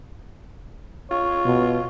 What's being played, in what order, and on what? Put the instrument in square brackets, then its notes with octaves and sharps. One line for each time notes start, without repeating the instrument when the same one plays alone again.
[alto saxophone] F4 [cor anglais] C#5
[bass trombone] B2